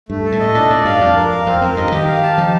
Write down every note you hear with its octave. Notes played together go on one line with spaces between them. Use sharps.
G2 A3
A4
A2
D#5
A#2 D4
A2 D5
G2 F5
F2 D4
A#4
F5
F2 C4
F2 A#4
G2 D#5
D#3 G4
F5
A5
F3 D#4